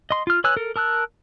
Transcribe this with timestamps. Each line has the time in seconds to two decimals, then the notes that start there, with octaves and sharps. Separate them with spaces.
0.11 D#5 C6
0.27 F4 F6
0.44 B4 C#5 G#5 E6 F#6
0.57 A4 A#4
0.76 A#4 A5 E6 F#6